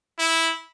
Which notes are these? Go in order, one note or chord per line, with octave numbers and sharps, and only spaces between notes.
E4